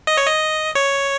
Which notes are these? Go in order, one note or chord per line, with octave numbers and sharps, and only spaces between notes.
D#5
C#5
D#5
C#5